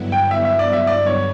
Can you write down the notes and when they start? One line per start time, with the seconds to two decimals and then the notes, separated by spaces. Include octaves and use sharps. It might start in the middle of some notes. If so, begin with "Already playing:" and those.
Already playing: G2 D3 F#3 B3 E4
0.12 G5
0.31 E5
0.45 E5
0.59 D5
0.73 E5
0.87 D5
1.06 C#5